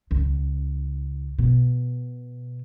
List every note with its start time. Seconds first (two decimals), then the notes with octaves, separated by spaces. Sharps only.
0.11 C#2
1.39 B2